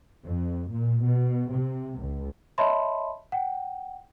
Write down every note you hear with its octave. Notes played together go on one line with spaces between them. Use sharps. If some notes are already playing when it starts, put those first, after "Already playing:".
F2
A#2
B2
C3
C#2
C#5 D#5 E5 A5 B5 C6
F#5 G5